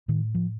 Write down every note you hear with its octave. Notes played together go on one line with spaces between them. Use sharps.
A2 D#3
F3